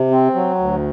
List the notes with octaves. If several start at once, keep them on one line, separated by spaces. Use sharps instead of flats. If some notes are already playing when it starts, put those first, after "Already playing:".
Already playing: C3
C4
F#3
D2